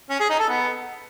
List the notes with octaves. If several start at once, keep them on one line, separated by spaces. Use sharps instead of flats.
C#4
G#4
D#4
A4
B3